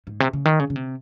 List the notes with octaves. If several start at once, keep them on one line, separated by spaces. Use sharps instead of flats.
G#2
C3
C#3
D#3
C#3
C#3
C3